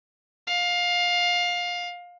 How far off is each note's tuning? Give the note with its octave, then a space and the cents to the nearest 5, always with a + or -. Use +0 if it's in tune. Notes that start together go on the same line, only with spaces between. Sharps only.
F5 +20